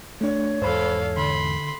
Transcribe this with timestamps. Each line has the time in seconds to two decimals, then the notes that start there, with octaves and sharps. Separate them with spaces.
0.21 A3 D4 C#5
0.62 E2 G#2 A4 C5 F5 B5
1.17 D3 B5 C6